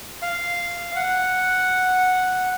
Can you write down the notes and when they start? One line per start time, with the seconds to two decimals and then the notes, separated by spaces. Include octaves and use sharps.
0.22 F5
0.96 F#5